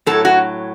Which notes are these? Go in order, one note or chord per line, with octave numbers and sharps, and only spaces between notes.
A2 F#3 A4
F#4